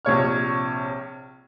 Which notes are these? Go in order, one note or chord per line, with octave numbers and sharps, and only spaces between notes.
A#1 C3 C#5 F6